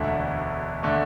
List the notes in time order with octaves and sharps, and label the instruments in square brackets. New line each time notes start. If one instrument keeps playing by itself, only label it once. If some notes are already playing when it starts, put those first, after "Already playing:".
Already playing: [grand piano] E1 D2 D3 A3
D3 A3